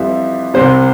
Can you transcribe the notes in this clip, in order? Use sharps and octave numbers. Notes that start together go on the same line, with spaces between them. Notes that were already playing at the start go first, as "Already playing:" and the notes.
Already playing: F2 E3 G3 E5
C2 C3 G3 C5